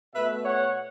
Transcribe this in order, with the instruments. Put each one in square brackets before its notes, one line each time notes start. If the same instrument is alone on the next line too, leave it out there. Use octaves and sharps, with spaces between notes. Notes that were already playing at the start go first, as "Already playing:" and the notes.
[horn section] B2 A3 B4 E5
C#5 F#5